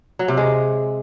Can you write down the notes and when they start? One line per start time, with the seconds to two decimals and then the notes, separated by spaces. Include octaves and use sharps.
0.19 F#3
0.28 C3
0.37 G#3